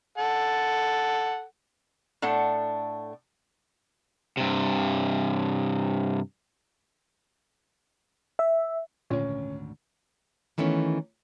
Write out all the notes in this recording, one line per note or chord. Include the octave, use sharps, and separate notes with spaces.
A4 F#5
A2 D4 A4 F#5
G2 C3
E5
G#1 D2 A#2 D3 C#4
D#3 E3 A3 B3 C#4